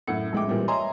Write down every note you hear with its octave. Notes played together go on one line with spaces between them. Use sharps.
F#2 A2 F#5 C#7
A#1 A2 G#3 A3 G5 D6
A#2 E3 G3 G#3 C4
C#5 D#5 E5 G#5 A#5 C6